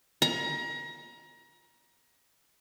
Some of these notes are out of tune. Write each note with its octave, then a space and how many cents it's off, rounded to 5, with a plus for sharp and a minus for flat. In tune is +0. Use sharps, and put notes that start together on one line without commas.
A#5 +30